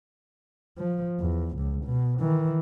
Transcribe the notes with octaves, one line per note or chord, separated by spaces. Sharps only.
F3
E2
C#2
B2
D#3 E3